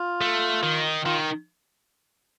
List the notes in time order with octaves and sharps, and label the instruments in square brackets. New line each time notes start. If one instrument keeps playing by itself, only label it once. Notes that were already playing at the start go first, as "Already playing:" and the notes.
Already playing: [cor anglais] F4
[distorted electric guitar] A3
D#3
[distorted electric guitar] D#3 [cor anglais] F4